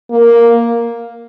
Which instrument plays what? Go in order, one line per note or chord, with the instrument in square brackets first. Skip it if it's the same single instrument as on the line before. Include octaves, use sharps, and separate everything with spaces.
[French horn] A#3